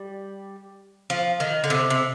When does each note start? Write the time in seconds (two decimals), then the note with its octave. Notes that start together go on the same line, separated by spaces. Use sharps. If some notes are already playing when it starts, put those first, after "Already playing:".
Already playing: G3
1.10 F3
1.40 D#3
1.64 D3
1.70 C3
1.90 C3